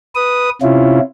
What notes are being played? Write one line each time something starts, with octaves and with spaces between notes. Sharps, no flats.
B4 D#6
C3 C#4 E4 F4